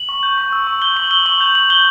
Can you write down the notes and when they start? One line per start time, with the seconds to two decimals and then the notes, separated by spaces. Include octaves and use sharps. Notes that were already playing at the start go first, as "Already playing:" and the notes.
Already playing: F#7
0.09 C#6
0.23 G6
0.38 C#6
0.52 E6
0.67 C#6
0.82 G6 G7
0.96 C#6 F#7
1.11 E6 G7
1.26 C#6 F#7
1.40 G6 F7
1.55 C#6 F#7
1.70 G6 G7